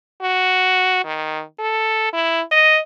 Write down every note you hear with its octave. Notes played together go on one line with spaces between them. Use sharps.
F#4
D#3
A4
E4
D#5